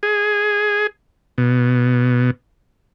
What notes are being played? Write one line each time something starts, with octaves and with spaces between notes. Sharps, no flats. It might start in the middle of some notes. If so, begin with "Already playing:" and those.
G#4
B2